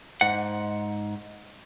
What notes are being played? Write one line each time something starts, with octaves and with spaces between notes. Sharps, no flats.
G#2 F#5